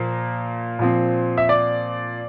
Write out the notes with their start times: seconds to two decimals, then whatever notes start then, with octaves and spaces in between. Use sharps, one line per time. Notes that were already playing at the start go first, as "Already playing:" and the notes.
Already playing: A#2 F3 A#3
0.79 A#2 F3 C4
1.38 E5
1.49 D5